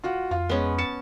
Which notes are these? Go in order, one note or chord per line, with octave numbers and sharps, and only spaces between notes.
F4 F#4 F#5
F2 F4 F5
G#3 B3 C#4
A5 C#7